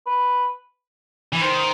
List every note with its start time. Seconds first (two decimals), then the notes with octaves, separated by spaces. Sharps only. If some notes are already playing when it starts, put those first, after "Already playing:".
0.07 B4
1.33 E3
1.42 D#3 C5